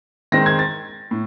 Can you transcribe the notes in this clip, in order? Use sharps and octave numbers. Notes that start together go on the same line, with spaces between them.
D#3 G#3 C4 A#6
G#6
A6
A2